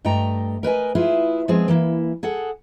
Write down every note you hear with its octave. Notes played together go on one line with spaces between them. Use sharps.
G2 A3 D#5 G5 A#5
A#4 B4 D#5 G#5
E4 F4 G#4 B4
F3 G#3 B3 C4 G#4
E3 A#3 E4
G#4 A4 F#5